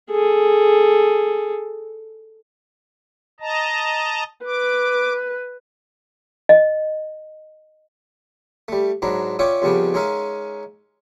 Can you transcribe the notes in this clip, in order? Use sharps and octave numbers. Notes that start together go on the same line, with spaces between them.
G#4 A4
D#5 A5 A#5
B4 D6
D#5
G3 A3
G#2 F#3 D4 A#5 B5
C#4 F4 C#5 D5 E5 G5
F2 C#3 G3 B3 C#4 D4
G#3 C#4 D#4 A#4 E5 F5